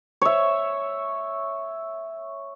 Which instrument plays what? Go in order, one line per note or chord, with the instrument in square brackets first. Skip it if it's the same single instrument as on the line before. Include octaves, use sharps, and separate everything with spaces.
[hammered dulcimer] C#5 E5